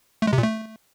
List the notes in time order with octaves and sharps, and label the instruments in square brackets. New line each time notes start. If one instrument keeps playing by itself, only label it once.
[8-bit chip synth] A3
G#3
C3
A#2
A3